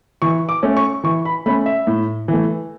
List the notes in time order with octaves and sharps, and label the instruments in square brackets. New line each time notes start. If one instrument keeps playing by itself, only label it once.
[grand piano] E3 C#6
D6
A3 C#4
C#6
E3 C#6
B5
A3 C#4 B5
E5
A2
E3 A3